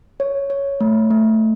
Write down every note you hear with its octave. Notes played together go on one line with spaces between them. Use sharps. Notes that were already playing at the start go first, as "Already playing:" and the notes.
C#5
C#5
A3
A3